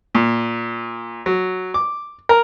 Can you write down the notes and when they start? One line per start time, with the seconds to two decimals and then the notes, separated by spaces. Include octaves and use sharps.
0.15 A#2
1.26 F#3
1.74 D6
2.29 A#4